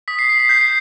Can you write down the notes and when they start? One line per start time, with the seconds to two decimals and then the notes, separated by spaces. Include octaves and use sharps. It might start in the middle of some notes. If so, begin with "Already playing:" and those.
0.08 D#6 B6
0.19 C7
0.29 B6
0.40 C7
0.49 G6 B6
0.61 C7